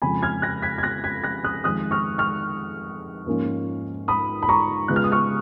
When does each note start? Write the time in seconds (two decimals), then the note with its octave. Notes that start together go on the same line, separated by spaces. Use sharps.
0.02 F2 C#3 G#3 G#5 B5
0.23 F6 G#6
0.42 F#6 A#6
0.62 G#6 B6
0.78 G#6
0.83 F#6 A#6
1.04 G#6 B6
1.24 F#6 A#6
1.44 D#6 F#6
1.64 F2 D#3 G#3 D#6 F#6
1.91 C#6 F6
2.18 C#6 F6
3.26 G#2 F3 A#3 C#4 F4
4.08 B5 D#6
4.43 B5
4.49 A#5 C#6
4.88 C#3 G#3 B3 F4 F#6
4.96 F6
5.04 D#6
5.12 C#6 F6